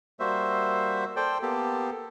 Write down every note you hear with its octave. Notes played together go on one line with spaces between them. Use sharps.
G3 A#3 F#4 C5 E5
A4 C5 D5 G5
A#3 B3 G4 A4